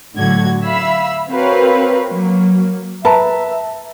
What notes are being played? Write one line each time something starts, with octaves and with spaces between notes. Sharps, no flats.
A2 D3 F#3 F#4 G#6
E5 F5 B5 E6
C4 F#4 A#4 B4 C#5 F5
F#3 A#3
B4 E5 A5 A#5